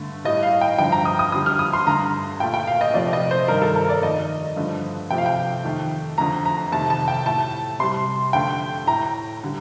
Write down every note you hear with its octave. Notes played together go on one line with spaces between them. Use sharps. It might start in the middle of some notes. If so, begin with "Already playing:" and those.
Already playing: G2 D3 A3
A2 G3 D#5
F5
G5
G2 D3 F3 G5
A#5
D#6
D#6
F2 D3 G3 D#6
F6
D#6
C6
G2 D3 A3 A#5
A#2 A3 G5
G5
F5
D#5
F2 C3 F3 A3 D5
D#5
C5
G2 D#3 G3 A#4
A4
A#4
D5
F2 D#3 A3 D#5
G2 D3 F3 A3
C3 F3 A3 G5
F5
G5
F2 D#3 A3
F2 D3 A3 A#5
A#5
F2 C3 D#3 A3 A5
A5
G5
A2 A3 A5
C3 G3 C6
F2 D3 A3 G5
A2 A3 A#5
D3 G3